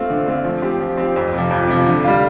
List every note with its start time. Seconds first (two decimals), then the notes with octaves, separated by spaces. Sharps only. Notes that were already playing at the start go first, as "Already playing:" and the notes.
Already playing: A3 C4 F4
0.10 D3
0.26 A3 C4 F4
0.44 F3
0.62 C4 G4
0.80 F3
0.97 C4 G4
1.16 F2
1.33 C3 F3
1.51 F2
1.68 C3 F3
1.86 D3
2.04 G3 F4